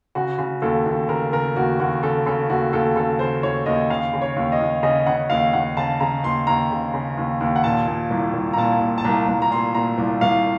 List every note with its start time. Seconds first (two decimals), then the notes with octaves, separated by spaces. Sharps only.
0.15 C#3 F#4
0.39 C#3
0.62 D#2 A4
0.86 D#2
1.09 C#3 A#4
1.33 C#3 A#4
1.56 D#2 F#4
1.80 D#2 F#4
2.03 C#3 A4
2.26 C#3 A4
2.49 D#2 F#4
2.73 D#2 A4
2.96 C#3 A4
3.19 C#3 C5
3.43 D#2 C#5
3.66 D#2 D#5
3.90 C#3 F5
4.14 C#3
4.22 C#5
4.36 D#2
4.52 D#5
4.61 D#2
4.83 C#3 D#5
5.06 C#3 F#5
5.30 D#2 F5
5.53 D#2 F#5
5.77 C#3 A5
6.00 C#3 A#5
6.23 D#2 C6
6.47 D#2 A#5
6.71 C#3
6.94 C#3
7.18 D#2
7.41 D#2
7.56 F#5
7.64 A#2 A5
7.87 A#2
8.10 C2
8.34 C2
8.53 A#5
8.57 A#2 A5
8.81 A#2
8.98 A5
9.04 C2 A#5
9.28 C2
9.42 A#5
9.51 A#2 C6
9.75 A#2 A#5
9.98 C2
10.21 C2 F5